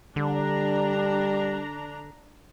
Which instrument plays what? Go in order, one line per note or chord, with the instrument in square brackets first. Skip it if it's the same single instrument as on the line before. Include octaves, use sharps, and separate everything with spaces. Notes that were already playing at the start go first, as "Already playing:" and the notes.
[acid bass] D3 [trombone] G3 [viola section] D4 A#5